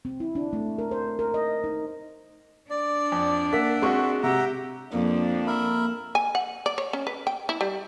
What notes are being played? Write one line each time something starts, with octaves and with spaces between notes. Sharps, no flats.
C4
E4
D4
A3
A#4
C5
A#4
D#5
D#4
D4 D5
F2
A#3 E5 F#5 B6
G#3 C4 F#4 C#6
C3 G4 E5 F#5 A#5
F2 F3 A#3 D4
A#4 E5 B5
G#5
F#5
D5
C#5
C#4
B4
G5
E4
G3